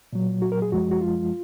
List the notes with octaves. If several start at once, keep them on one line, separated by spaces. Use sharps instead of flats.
A#2 F#3
F#4
A#4
G#4
F#2 F3 G#3 F#4
F#4
F4